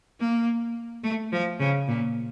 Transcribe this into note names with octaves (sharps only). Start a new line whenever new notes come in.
A#3
A3
F3
C#3
A#2